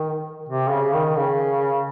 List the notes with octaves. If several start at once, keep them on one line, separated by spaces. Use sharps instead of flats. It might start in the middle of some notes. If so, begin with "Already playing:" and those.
Already playing: D#3
C3
C#3
D#3
C#3